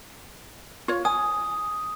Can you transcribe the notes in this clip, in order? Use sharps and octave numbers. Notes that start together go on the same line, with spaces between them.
F4 C#5
G#5 D#6